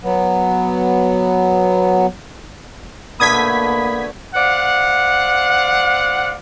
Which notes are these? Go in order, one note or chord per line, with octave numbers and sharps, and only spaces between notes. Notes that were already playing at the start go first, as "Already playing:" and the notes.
F#3 B3
B2 D3 A3 A#3 B5 D#6 G#6 B6
C5 D5 F5 F#5